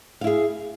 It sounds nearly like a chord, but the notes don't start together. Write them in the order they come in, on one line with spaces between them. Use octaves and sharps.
F5 E4 G#4